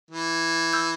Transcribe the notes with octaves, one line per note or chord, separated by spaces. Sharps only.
E3
E6 G6